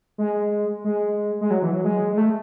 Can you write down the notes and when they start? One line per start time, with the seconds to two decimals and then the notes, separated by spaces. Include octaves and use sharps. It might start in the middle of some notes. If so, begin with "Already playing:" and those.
0.18 G#3
0.84 G#3
1.41 G#3
1.51 F#3
1.62 E3
1.73 F#3
1.84 G#3
2.11 G#3
2.18 A3